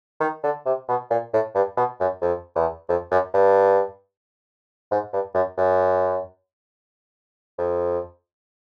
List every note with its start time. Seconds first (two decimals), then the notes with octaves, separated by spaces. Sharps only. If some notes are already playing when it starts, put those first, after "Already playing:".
0.20 D#3
0.43 D3
0.66 C3
0.88 B2
1.10 A#2
1.33 A2
1.55 G2
1.77 B2
2.00 F#2
2.22 F2
2.55 E2
2.89 F2
3.11 F#2
3.34 G2
4.91 G#2
5.13 G2
5.35 F#2
5.57 F#2
7.58 F2